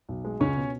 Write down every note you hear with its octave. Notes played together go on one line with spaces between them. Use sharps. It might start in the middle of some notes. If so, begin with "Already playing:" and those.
B1
G#3
C#2 C#4 C#5
B2